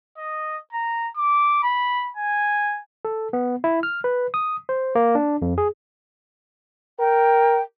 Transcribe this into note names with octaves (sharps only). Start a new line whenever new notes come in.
D#5
A#5
D6
B5
G#5
A4
B3
E4
F6
B4
D#6
C5
A#3
D4
F2
G#4
A#4 G5